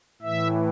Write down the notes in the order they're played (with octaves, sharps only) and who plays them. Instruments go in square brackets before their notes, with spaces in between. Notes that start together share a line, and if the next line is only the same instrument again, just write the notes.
[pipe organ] A2 E3 E5